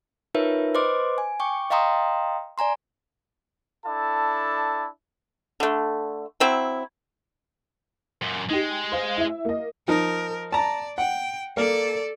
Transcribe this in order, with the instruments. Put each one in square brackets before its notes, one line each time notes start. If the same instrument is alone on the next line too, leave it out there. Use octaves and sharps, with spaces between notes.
[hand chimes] D#4 F4 A#4 B4 C#5 E5
B4 C5 D#5 C6 D6
G#5
G5 C#6 D6
D#5 F5 G5 A#5 C6 D#6
D5 G#5 A#5 C6
[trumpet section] D4 E4 A4 A5
[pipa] D3 A3
F#3 C4 E4
[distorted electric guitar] F#2 A#2
[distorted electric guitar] G#3 [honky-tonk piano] D#4 G4
[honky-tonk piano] C5 F5
E4 E5
A#3 D#5
[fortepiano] F3 D#4 [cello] A#4
[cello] D5 [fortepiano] A5 A#5
[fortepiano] F#5 [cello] G5
[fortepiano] A#3 [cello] A4 D5